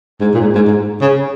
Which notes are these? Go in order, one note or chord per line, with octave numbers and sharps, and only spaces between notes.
G#2
A#2
G#2
G#2
G#2
C#3